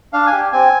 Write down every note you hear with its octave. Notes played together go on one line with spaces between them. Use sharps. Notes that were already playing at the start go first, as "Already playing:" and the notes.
D4 F5
G#5
G4
C4 G#5